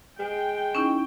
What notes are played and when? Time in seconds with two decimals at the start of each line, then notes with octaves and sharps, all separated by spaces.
0.19 G#3 G5
0.75 C#4 D#4 E4